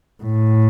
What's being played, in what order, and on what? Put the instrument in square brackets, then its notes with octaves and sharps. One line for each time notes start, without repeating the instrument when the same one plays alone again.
[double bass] A2